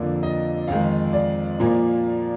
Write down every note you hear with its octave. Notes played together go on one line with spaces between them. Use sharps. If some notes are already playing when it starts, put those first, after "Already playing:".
Already playing: F2 D3 F3 A#3
D#5
F2 D#3 G#3 F5
D5
A#2 F3 A#3